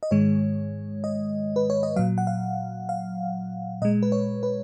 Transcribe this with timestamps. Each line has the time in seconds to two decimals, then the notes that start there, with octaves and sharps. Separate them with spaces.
0.03 D#5
0.11 G#2 D#3 G#3 C#5
1.04 D#5
1.56 B4
1.70 C#5
1.83 D#5
1.96 A#2 F#3 F5
2.18 F#5
2.27 F5
2.89 F5
3.82 A#2 G#3 D#5
4.03 B4
4.12 C#5
4.43 B4